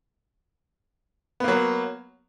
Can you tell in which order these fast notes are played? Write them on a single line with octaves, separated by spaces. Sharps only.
B3 A#3 F#3